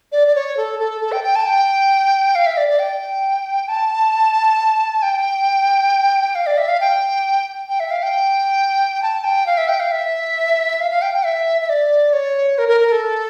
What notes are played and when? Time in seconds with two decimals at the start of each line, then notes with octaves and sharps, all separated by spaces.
0.12 D5
0.28 D5
0.35 C#5
0.57 A4
0.80 A4
1.01 A4
1.12 G5
1.24 G5
1.36 A5
1.46 G5
2.35 F5
2.46 E5
2.57 D5
2.69 D5
2.79 G5
3.68 A5
5.02 G5
6.35 F5
6.46 D5
6.58 E5
6.68 F5
6.80 G5
7.69 G5
7.80 E5
7.91 F5
8.03 G5
9.02 A5
9.24 G5
9.46 F5
9.57 E5
9.68 G5
9.80 F5
9.91 E5
10.80 F5
10.91 F5
11.02 G5
11.14 G5
11.25 E5
11.61 E5
11.69 D5
12.13 C#5
12.58 A#4
12.69 A#4
12.81 A#4
12.92 A4